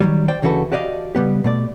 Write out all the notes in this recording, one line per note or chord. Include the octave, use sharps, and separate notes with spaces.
D#3 F#3 G3
C5 D5 G5
D2 C#3 E3 F#4 A4 B4
F#4 G4 D5 D#5 F5
C#3 G3 B3 G4
B2 A3 D5